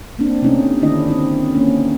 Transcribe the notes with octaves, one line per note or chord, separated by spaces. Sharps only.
A#3 C4 D4
C3 A3 C#4 D#4
D3 D#3 A3 D4 E4 D#5
C4 D#4
A#3 C#4